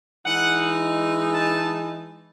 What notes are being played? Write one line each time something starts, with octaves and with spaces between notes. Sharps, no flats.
E3 G#3 D#4 F#5
A5